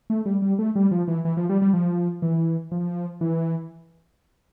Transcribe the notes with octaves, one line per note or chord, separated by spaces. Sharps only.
A3
G3
G3
A3
G3
F3
E3
E3
F3
G3
G3
F3
E3
F3
E3